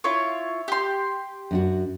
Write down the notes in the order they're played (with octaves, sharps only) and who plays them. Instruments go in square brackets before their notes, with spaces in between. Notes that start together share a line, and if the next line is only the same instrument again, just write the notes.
[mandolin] E4 F4 C#5
G4 C6
[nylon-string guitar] F#2 D4 F#4